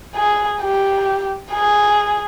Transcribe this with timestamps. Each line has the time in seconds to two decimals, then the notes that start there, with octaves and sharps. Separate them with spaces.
0.16 G#4
0.61 G4
1.53 G#4